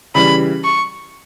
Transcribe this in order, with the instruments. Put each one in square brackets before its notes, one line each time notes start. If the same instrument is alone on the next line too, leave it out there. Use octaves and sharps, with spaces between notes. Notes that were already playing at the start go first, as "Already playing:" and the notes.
[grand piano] C#3 E3 G3 [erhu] B5
[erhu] C#6